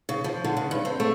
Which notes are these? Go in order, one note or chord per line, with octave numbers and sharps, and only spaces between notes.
C#3
F3
D3
C#3
G2
C4
A3